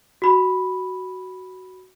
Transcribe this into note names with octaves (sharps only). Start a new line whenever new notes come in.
F#4 B5